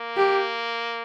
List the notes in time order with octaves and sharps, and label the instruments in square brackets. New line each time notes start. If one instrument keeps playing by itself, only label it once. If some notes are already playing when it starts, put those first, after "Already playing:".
Already playing: [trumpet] A#3
[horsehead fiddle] G4